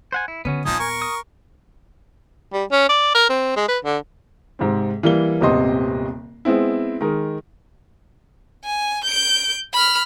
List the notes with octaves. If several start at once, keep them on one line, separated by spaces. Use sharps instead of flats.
C5 F#5 G#5
E4
D3 B3 C#4 F#4
D#1 F3 B3 D#4 D#5 G#5
A#4 C#6
D#6
G3
C#4
D5
A#4
C4
G#3
B4
D3
G#2 C3 C4
E3 G3 A#3 G7
D#1 G#1 C3 B3 D#5 C6
G#3 B3 C4 E4
D#3 G#3 A#4
G#5
G6 D7
B5 F6